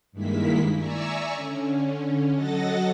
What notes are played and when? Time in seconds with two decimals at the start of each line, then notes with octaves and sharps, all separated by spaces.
0.12 G2 D#3 G#3 A#3 E4 B6
0.75 D5 E5 G#5 A#5 C#6 E6
1.32 D3 C#4
2.33 F#3 A4 D#5 F#5 A6 A#6